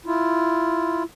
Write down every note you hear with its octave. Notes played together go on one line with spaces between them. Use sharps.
E4 F4